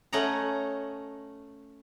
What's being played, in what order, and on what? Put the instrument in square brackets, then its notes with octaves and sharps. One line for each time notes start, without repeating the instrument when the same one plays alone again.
[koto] A3 C#4 D#5 F#5 A#5